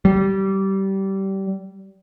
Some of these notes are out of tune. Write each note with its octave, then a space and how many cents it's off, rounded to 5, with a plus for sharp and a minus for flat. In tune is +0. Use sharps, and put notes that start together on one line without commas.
G3 -20